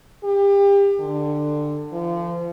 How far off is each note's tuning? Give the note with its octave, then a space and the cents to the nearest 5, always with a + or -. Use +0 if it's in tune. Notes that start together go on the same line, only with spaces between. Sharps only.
G4 +30
D3 +20
F3 -30